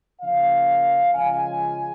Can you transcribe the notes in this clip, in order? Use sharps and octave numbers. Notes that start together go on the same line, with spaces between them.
C#3 F3 A#3 C#4 F5
C#3 F3 G#3 C#4 G#5